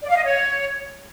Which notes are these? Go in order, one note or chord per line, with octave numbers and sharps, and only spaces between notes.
D5
F5
D#5
C#5